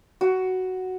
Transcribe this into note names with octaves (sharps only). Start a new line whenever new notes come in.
F#4